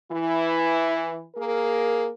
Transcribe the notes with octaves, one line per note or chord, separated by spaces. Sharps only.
E3 E4
A#3 G#4 A#4